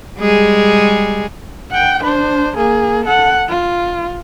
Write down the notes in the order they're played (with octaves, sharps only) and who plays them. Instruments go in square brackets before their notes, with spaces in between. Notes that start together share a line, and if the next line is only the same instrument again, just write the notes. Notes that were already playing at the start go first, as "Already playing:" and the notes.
[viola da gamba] G3 G#3 G#4
[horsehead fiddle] F#5 G5
D4 C5
A#3 G#4
A4 F#5
F4